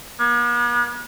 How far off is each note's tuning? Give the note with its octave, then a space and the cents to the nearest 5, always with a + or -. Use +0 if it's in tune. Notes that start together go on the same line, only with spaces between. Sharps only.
B3 -45